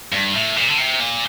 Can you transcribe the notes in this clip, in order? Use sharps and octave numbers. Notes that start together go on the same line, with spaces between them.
G2
A2
A#2
D3
C3
A#2